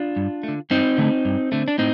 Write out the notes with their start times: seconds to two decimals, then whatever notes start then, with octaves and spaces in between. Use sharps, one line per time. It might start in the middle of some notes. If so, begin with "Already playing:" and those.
Already playing: D4 F4
0.16 G2
0.43 D3 A3
0.70 G2 C4 D#4
0.98 D3 A3
1.25 G2
1.52 D3 A3
1.68 D4
1.78 A2 C4 D#4